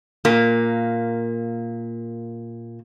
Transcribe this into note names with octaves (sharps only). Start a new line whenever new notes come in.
A#2 A#3